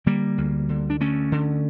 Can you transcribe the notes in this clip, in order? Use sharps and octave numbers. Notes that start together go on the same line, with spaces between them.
D3 G3 A#3
D2
D3
D4
D2 A3 C#4
D3